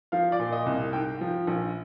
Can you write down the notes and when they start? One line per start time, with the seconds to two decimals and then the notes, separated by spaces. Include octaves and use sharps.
0.12 F3 F5
0.32 D5
0.39 A#2
0.52 D#5
0.66 C2
0.93 G#2 G5
1.21 F3
1.47 A#1